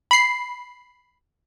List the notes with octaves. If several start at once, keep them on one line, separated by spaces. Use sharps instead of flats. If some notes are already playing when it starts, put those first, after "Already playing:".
B5 C7